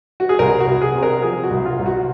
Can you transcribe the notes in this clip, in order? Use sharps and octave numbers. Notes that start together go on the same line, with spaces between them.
F#4
G#4
C2 A#4
F#4
C2
G#4
C3
A#4
F3 G#4
F#4
C2
F4
C2
F#4